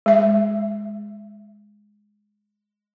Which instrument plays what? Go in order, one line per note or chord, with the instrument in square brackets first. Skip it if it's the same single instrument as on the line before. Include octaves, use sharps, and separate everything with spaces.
[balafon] G#3 E5